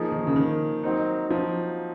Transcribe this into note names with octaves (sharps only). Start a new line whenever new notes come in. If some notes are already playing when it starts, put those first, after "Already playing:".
Already playing: F3 A#3 D#4 G#4
D#3
C#3
D#3
F#3 C4 D#4
F3